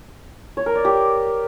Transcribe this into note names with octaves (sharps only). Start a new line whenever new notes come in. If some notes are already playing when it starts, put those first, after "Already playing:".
C#5
A#4
D5
G4